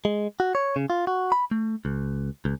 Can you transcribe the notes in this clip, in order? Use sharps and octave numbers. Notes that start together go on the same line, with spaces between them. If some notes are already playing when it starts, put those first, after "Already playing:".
G#3
F#4
C#5
C#3
F4
F#4
B5
A3
C#2
C#2